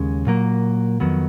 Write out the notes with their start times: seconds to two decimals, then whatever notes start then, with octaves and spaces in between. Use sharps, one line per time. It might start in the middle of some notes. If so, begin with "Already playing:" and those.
Already playing: D#2 C#3 G#3 C#4
0.27 A#2 F#3 A#3
1.00 F2 D#3 F#3 B3